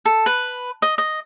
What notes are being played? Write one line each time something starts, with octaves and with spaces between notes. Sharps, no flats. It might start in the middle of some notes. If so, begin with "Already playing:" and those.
A4
B4
D#5
D#5